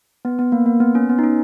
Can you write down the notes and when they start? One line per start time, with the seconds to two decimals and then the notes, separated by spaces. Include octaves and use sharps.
0.25 B3
0.39 B3
0.52 A#3
0.66 A#3
0.80 B3
0.95 C#4
1.09 B3
1.19 D#4
1.23 C#4